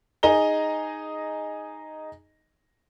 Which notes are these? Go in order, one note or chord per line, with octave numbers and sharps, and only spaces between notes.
D#4 G#4 D#5 A#5 G7